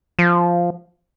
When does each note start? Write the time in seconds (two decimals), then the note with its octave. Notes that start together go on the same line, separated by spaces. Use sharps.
0.19 F3